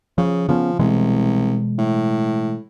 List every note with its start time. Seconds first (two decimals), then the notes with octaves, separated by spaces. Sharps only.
0.18 C#3 F3
0.48 C#3 F3 B3 C#4
0.79 C2 B2 E3 G#3
1.78 A2